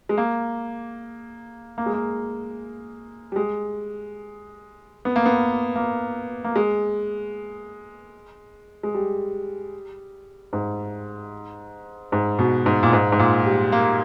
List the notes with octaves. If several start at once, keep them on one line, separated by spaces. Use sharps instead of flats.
G#3
A#3
A#3
G#3
A#3
G3
G#3
B3
A#3
B3
A#3
A#3
G#3
G#3
G3
G#2
G#2
B2
G#2
A#2
G#2
G#2
A#2
G3
A#3